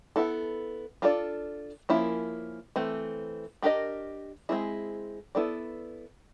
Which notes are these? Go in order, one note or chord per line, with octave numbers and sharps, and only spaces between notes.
B3 E4 A4
D4 F4 A4 D5
F3 A#3 C#4 E4
E3 A3 C4
D4 G4 A#4 D#5
G#3 C4 E4 G#4
B3 E4 A4 D5